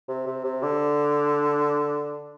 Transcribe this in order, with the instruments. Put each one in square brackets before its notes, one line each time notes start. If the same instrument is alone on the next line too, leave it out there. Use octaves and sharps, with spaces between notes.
[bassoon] C3
C3
C3
D3